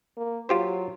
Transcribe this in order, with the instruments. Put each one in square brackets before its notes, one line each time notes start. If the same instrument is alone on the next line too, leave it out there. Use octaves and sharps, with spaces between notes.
[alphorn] A#3
[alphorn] F#3 [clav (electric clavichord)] F4 G4 C5